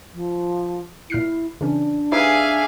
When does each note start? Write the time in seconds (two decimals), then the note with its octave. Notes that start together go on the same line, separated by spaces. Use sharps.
0.14 F3
1.10 A#2 E4 F6 C7
1.61 C#3 E3 C#4 D4
2.12 D#4 G4 G#4 B4 E5 F5 G#5 D6